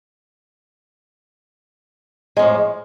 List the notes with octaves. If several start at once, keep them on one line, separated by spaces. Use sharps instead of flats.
F2 A2 G#3